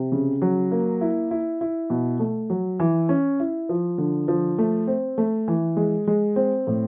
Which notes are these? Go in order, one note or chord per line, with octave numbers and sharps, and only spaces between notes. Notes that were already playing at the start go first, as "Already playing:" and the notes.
Already playing: C3
C#3
F#3
A#3
E4
E4
E4
B2
A3
F#3
E3
C#4
E4
F3
D3
F3
A3
C4
A3
E3
G#3
G#3
C4
A2